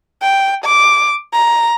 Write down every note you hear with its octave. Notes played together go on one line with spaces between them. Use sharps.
G5
D6
A#5